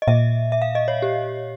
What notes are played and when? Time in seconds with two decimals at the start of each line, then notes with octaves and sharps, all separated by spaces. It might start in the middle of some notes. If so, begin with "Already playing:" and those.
0.02 D#5
0.08 A#2 E5
0.52 E5
0.62 F5
0.75 D#5
0.88 C#5
1.02 G4